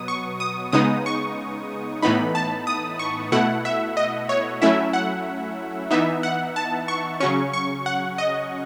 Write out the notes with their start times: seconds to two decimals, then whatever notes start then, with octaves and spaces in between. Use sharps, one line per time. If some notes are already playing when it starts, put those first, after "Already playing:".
Already playing: B2 F#3 B3 D#6
0.08 C#6
0.40 D#6
0.73 C#3 G#3 B3 D#4 D#6
1.06 C#6
2.03 A2 E3 B3 D#4 B5
2.35 A5
2.67 D#6
2.99 C#6
3.32 B2 A3 E4 F#5
3.65 E5
3.97 D#5
4.29 C#5
4.62 F#3 A3 C#4 E4 E5
4.93 F#5
5.91 E3 B3 D#4 E5
6.23 F#5
6.56 A5
6.88 C#6
7.20 C#3 F#3 C#4 C#6
7.53 C#6
7.86 F#5
8.18 D#5